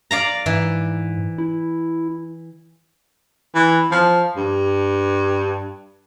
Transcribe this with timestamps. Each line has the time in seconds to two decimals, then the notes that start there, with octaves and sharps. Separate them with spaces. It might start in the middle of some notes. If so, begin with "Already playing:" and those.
0.11 D5 F5 A#5
0.46 G#2 E3
1.38 E4
3.55 E3
3.92 F3
4.37 G2